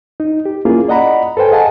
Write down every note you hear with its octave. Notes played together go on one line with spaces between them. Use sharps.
D#4
G4
A#3 C#4 E4 F4 G#4
D5 D#5 F#5 A#5 B5
A4 B4 C5 G5 G#5
G#4 D#5 F5 F#5 G#5 A5